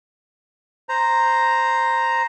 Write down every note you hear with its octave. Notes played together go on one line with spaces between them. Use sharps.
C5 A#5